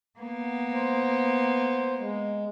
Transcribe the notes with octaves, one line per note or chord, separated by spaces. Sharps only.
A#3 B3
C5
G#3